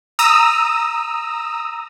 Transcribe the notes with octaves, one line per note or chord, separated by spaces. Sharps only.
A#5 D#6 E6